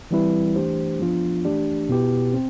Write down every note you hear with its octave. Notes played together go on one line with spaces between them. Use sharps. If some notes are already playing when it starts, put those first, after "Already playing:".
E3 G3 C4 E4 B4
E3 A3 D4 G4 C5
F3 B3 D4 F4
E3 A3 D4 G4 D5
B2 B3 E4 G4 B4
C4